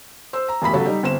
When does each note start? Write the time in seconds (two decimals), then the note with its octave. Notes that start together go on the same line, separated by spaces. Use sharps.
0.33 C5 E6
0.49 A#5
0.62 E1 A1 B5 B6
0.73 C#3 F#3 A4
0.85 G3 D#4
1.03 G1 C4 E7